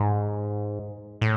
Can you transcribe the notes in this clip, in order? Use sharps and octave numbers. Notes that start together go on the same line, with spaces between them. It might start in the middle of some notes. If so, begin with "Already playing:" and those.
Already playing: G#2
A2